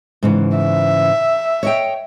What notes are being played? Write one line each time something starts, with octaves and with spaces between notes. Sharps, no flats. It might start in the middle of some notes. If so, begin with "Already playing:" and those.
G#2 C#3 E3
E5
C#5 D#5 G5